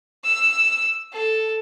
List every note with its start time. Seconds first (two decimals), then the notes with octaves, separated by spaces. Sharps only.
0.24 E6
1.13 A4